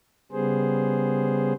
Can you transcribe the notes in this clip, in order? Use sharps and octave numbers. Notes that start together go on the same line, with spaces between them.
C#3 G3 B3 G#4 C5